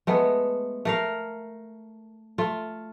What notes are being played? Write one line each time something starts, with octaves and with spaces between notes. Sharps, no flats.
G#3 A3 B3
A3 A#4 F5
A3 F4